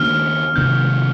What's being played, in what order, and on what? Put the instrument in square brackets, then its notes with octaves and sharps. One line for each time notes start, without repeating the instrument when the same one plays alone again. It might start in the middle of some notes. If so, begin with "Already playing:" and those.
Already playing: [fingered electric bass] D#3 A#3 D4 [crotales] F6
[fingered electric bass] C3 D#3 A#3 D4 [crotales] G6